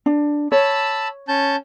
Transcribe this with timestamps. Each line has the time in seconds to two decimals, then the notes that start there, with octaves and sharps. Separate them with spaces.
0.06 D4
0.52 C#5 A5 B5 E6
1.28 C#4 A5 G6